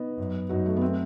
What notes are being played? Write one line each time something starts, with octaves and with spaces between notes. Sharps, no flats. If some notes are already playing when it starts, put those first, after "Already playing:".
Already playing: B3 D#4
F#2
F#2 D#4 F#4
A3
B3
A3 C4